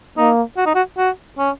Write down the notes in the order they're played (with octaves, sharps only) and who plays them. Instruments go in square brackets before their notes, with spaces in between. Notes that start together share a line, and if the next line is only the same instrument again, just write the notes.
[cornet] A#3 [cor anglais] D#4
[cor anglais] F#4
D#4
F#4
F#4
C#4